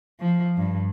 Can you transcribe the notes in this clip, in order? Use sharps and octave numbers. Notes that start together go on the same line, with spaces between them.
F3
G2